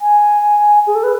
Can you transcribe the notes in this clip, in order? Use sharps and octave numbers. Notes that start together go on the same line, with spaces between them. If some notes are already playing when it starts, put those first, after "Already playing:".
G#5
G#4
A4
B4